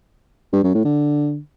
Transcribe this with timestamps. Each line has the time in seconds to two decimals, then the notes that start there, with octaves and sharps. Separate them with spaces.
0.53 G2
0.64 F#2
0.74 A2
0.85 D3